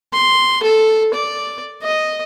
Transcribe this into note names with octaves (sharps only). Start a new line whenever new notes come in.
C6
A4
D5
D#5